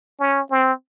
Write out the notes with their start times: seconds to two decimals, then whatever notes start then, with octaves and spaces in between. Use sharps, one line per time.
0.20 C#4
0.51 C4